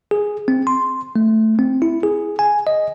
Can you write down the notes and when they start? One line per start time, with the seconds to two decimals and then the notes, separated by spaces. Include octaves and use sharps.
0.11 G#4
0.48 C4
0.67 C6
1.16 A3
1.59 C4
1.82 E4
2.03 G#4
2.39 G#5
2.67 D#5